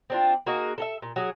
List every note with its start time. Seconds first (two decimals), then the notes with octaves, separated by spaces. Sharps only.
0.10 C4 D4 F4
0.46 A#3 D#4 F#4 G#4
0.78 A4 A#4 E5
1.02 A#2
1.16 F#3 G#4